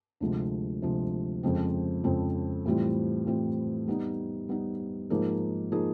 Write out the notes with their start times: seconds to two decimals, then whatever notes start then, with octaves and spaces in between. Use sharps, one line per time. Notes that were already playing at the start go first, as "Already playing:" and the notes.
0.20 D2 C3 F3 G#3
0.82 D2 C3 F3 G#3
1.43 F2 C#3 F3 G#3 C4
2.04 F2 C#3 F3 G#3 C4
2.66 A2 E3 G3 C4 F4
3.27 A2 E3 G3 C4 F4
3.88 G3 B3 D#4
4.49 G3 B3 D#4
5.10 G#2 F3 A#3 D#4 G#4
5.72 F3 A#3 D#4 G#4